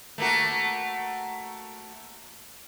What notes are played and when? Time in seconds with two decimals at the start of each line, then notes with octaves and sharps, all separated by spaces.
0.18 A3 A#3 F#4